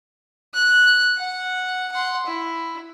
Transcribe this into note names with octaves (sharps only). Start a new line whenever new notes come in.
F#6
F#5
F#5 C6
E4